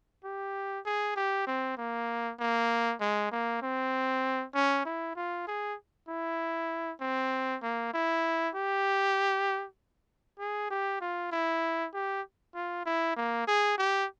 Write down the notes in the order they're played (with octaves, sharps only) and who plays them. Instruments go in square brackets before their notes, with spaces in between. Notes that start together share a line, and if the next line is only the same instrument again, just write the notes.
[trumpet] G4
G#4
G4
C4
A#3
A#3
G#3
A#3
C4
C#4
E4
F4
G#4
E4
C4
A#3
E4
G4
G#4
G4
F4
E4
G4
F4
E4
A#3
G#4
G4